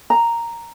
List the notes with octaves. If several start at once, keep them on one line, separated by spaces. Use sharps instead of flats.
A#5